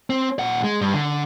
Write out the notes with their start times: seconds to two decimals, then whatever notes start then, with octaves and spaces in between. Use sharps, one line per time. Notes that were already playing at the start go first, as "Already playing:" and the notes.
0.10 C4
0.39 A#2 F#5
0.64 G#3
0.81 G2
0.94 D3